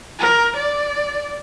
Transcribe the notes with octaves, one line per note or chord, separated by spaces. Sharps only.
A#4
D5